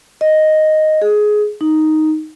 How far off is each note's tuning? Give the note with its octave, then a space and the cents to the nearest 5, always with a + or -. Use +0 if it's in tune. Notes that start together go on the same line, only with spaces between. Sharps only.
D#5 +0
G#4 +15
D#4 +0